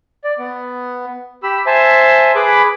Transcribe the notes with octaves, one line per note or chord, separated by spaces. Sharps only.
D5
B3
G4 B5 E6
C5 E5 G#5 A5
G#4 B4 B5 D6